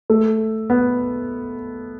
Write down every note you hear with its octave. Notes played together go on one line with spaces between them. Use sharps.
A3
B3